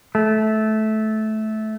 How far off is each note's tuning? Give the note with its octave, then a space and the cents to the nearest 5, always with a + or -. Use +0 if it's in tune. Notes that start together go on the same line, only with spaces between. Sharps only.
A3 -15